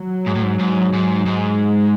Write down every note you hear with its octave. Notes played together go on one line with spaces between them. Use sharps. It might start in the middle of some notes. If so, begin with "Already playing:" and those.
Already playing: F#3
G#2
A2
G#2
G#2
G#2
G#2 G#3